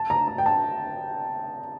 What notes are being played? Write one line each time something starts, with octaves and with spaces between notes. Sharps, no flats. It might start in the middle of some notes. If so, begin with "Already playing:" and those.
Already playing: A5
A#5
A#5
G5
A5